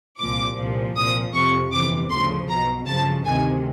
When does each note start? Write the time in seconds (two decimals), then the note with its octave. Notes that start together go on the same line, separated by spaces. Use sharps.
0.19 C2 A#2 F3 D6
0.57 C2 A#2 F3
0.96 C2 A#2 F3 D#6
1.33 F2 C3 F3 C#6
1.72 G1 F2 C3 E3 D6
2.10 D2 C#3 F3 C6
2.49 B1 B2 A#5
2.86 G1 F#2 C#3 F3 A5
3.26 D2 C3 D#3 G#5